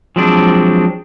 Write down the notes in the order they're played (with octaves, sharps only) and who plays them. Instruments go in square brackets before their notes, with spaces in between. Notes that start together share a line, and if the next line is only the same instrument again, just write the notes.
[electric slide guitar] F3 F#3 G#3 C4 D4